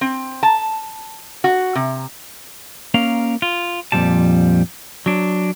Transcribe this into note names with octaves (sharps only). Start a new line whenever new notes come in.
C4
A5
F#4
C3
A#3 C#4 A#4 F5
F4
F2 A#2 F3 G3 A5
F#3 D4